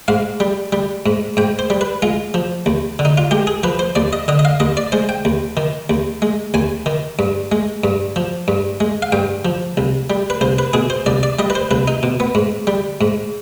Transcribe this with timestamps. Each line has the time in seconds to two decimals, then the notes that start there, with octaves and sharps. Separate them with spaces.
0.08 G#2 F5
0.40 G3
0.72 G3
1.06 G#2
1.37 G#2 G5
1.59 C5
1.70 G3
1.81 B4
2.02 G#3 F4
2.34 F3
2.66 D#2
2.99 D3
3.05 D#4
3.18 F4
3.31 G#3 G4
3.47 G#4
3.63 F3 B4
3.79 C5
3.95 D#2 D5
4.13 D#5
4.28 D3 D#5
4.39 D#5
4.45 F5
4.60 D#2 D#5
4.77 D5
4.92 G#3 C5
5.09 G5
5.25 D#2
5.57 D#3
5.90 D#2
6.22 G#3
6.54 D#2 G#5
6.86 D#3
7.19 G2
7.52 G#3
7.84 G2
8.16 F3
8.48 G2
8.80 G#3
9.02 F5
9.12 G2 G5
9.45 F3
9.77 C2
10.10 G3
10.30 B4
10.41 C2 C5
10.59 B4
10.73 B2 G#4
10.90 C5
11.06 C2 D5
11.23 D5
11.39 G3 D#5
11.50 B4
11.55 C5
11.71 C2 B4
11.88 D#4
12.03 B2
12.20 B3
12.35 G#2
12.67 G3
13.01 G#2